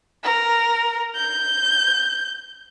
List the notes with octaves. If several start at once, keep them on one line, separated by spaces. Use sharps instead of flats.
A#4
G6